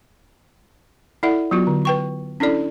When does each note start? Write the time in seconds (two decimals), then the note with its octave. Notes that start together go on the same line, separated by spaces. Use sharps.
1.23 E4 A4 D5 E5 F#5
1.51 F#3 B3 F4 F#4
1.67 D3
1.85 B4 G5 C#6
2.40 C#4 D4 E4 A4 D5